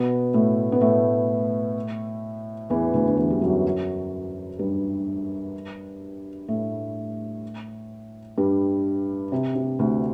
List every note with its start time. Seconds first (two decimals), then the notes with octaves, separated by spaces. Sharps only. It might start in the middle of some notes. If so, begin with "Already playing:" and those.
Already playing: B2 B3
0.34 A2 A3
0.72 B3
0.81 A2 A3
2.70 E2 E3
2.94 D2 D3
3.07 D3
3.17 E2 E3
3.30 G3
3.41 F#2 F#3
4.59 G2 G3
6.48 A2 A3
8.37 G2 G3
9.32 C3
9.55 C3
9.79 D2 D3